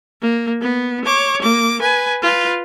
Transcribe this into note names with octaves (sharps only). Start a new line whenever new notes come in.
A#3
B3
C#5 D6
A#3 D6
B4 G#5
F4 B4